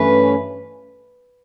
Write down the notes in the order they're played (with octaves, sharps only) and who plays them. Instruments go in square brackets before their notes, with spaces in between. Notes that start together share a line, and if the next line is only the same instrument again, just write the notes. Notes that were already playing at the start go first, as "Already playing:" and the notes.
Already playing: [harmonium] G2 E3 A3 C#4 [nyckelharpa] B4